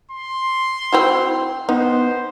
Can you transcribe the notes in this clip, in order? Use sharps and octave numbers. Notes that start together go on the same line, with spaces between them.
C6
C4 E4 F#4
B3 D#4 C5